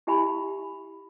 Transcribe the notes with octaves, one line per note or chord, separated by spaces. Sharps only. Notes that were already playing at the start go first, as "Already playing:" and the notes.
E4 G4 E5 G#5 B5